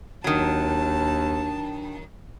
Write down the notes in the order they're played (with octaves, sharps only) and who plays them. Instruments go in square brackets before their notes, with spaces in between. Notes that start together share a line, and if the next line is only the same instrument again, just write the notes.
[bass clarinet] D#2 [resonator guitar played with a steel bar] D#3 F#3 [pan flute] D4 [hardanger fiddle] A5